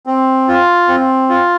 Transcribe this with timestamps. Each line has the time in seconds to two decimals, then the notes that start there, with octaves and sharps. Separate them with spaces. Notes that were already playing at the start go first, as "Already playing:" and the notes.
0.06 C4
0.48 F4
0.88 C4
1.29 F4